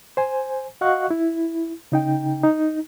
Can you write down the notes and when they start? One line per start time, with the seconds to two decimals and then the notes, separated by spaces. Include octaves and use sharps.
0.17 C5 G#5
0.81 F#4 D#5 F5 F#5 C#6 F#6
1.11 E4
1.92 C#3 D#4 G5
2.43 D#4